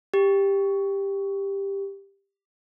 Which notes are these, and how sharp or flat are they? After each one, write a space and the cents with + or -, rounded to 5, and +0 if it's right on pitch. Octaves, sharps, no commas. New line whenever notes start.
G4 +10